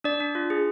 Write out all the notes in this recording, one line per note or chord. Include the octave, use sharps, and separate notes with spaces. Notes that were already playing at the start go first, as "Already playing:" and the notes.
D4 D5
D4
F4
G#4